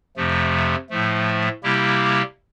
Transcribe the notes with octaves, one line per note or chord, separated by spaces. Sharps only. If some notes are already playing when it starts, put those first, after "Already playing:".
F2 C3 F3 A3
A2 F3 A3
C3 G3 A#3 E4 G4